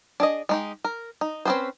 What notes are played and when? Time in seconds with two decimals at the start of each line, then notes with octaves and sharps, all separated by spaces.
0.20 D4 G#4 D#5
0.49 G#3 D#4 G4
0.84 A#4
1.21 D#4
1.45 C4 C#4 G#4 B4 C5